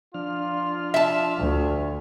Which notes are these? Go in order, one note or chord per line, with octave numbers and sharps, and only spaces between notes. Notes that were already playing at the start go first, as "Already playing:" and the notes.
F3 D4 F4 F6
E5 A5
D2